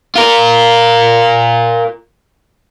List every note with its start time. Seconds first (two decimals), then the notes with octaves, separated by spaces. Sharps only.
0.15 F4 A#4